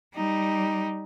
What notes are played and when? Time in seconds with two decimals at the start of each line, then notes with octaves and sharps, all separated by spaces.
0.14 G3 D#4